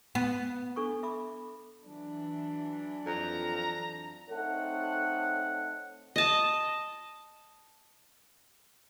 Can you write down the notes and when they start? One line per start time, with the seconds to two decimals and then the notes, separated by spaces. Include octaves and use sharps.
0.15 B3
0.76 D4 A4 C#6
1.03 E5 B5 D6
1.86 E3 F#3 D4
3.06 F2 A#5
4.30 A3 C4 D#4 A4 C#5 F#5
6.16 D#5 A5